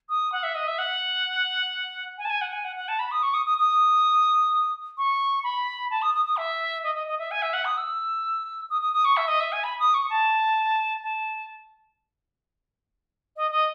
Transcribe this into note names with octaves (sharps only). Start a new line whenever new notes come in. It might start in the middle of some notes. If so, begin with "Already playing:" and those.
D#6
F#5
E5
D#5
E5
F#5
G#5
A5
G#5
F#5
G#5
F#5
F#5
A5
B5
D#6
C#6
D#6
D#6
D#6
C#6
B5
A5
D#6
D#6
D#6
E5
D#5
D#5
D#5
E5
G#5
E5
F#5
D#6
E6
D#6
D#6
D#6
C#6
E5
D#5
E5
G#5
B5
D#6
C#6
A5
A5
D#5
D#5